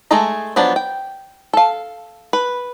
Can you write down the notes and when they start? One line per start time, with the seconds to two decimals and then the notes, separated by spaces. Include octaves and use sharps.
0.11 G#3 A3 G#4 A4 A#5
0.56 F3 F#3 B3 D4
0.76 G5
1.53 A4 F5
2.33 B4